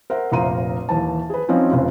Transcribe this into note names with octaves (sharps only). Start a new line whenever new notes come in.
A#4 C5 E5 F#5
F1 A#1 F5 A#5 C6 D#7
D#2 E3 A5
G#4 B4
F3 C4 C#4 D#4
F1 C#3 F4